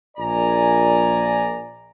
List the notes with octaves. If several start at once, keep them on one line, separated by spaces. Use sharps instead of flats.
A#1 D5 G#5 A#5